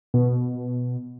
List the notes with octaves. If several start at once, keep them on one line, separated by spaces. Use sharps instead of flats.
B2